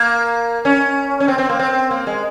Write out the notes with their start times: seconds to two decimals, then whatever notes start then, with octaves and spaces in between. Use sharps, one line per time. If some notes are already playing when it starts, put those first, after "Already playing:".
Already playing: A#3
0.65 C#4
1.20 C#4
1.28 C4
1.38 C4
1.49 A#3
1.59 C4
1.91 A#3
2.07 G#3